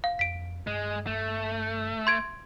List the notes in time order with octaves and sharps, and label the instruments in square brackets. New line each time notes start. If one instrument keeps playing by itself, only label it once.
[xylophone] F5
[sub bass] F2 [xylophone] B6 D7
[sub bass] G2 [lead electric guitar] G#3
[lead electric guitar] A3
[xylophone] C6 G#6 D7